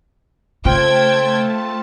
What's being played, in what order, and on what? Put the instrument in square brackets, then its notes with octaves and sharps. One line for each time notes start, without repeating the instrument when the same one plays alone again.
[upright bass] C#3 [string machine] A3 A5 [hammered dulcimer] C4 F4 [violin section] G5 G#6